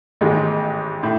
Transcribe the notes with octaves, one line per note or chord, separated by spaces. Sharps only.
A1 G#2 D#3 G#3 D#4
A2